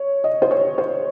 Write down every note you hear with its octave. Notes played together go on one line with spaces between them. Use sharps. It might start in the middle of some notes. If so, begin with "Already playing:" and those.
Already playing: C#5
D#5
C5
C#5
C5